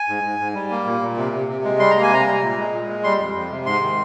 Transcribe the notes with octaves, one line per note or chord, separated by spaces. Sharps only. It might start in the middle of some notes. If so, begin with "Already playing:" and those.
Already playing: G#5
G#2
G#2
G#2
G3
A#3
A#2
A#2
C3
C3
C3
G#3
G3 C6
A#3 A#5
G#5
C3 A#5
G3
A#2
G#3
A#2
G#3
G3 C6
F2
F2
C3
G#2 C6
D#3